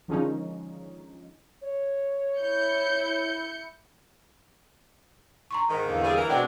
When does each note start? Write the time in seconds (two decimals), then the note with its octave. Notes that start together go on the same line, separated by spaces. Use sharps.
0.08 D3 D#3 F3 G#3 C#4 D#4
1.61 C#5
2.38 E4 G6 C#7
5.51 A#5 C6 C#6
5.69 G#2 D#3
5.85 E2 D3 A#3
6.03 G3 C4 G#4
6.16 E3 A#4
6.29 B2 G#3 C4 D4 C5 F#5 G5